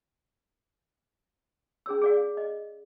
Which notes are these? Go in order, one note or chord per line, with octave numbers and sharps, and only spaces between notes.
C#4 G#4 C#5 E6
G#4 D5 F5
D#5